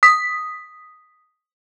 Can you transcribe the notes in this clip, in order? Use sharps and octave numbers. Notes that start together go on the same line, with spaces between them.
D#6 B6